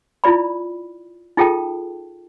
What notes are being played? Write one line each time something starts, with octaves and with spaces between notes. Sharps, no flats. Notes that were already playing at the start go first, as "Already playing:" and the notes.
E4 F4 D5 B5
D#4 F4 G#4 A4 G5 A5